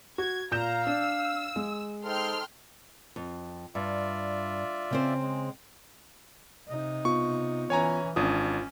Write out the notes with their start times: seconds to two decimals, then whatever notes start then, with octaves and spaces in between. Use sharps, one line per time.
0.18 F#4 G#6
0.51 A#2 F5 A#5 G6 E7
0.87 D4 E6
1.56 G#3
2.04 D#4 A4 C5 G5 C6 F6
3.16 F2
3.75 G2 F4 D5 E5
4.91 C#3 C4 C5
5.22 G#3
6.69 C3 D#4
7.05 B3 F4 C#6
7.70 E3 C#4 C#5 G#5 A#5
8.16 G#1 C#4 D4 F4 D#6